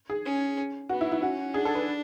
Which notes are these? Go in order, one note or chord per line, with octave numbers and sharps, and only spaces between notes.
G#4
C#4
B3 F#4
E4
E4
C#4 F#4
D4 G#4
A4
B4